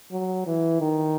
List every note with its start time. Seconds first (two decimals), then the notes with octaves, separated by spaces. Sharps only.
0.11 F#3
0.47 E3
0.81 D#3